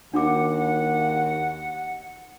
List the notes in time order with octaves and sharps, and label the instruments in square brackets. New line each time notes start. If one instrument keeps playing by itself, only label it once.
[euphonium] D#2 [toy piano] D4 F#4 D6 [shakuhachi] F#5